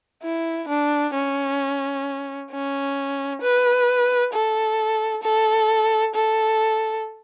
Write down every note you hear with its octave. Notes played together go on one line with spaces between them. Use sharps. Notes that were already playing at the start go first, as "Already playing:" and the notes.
E4
D4
C#4
C#4
B4
A4
A4
A4